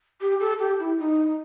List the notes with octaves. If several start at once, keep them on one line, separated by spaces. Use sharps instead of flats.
G4
A4
G4
E4
D#4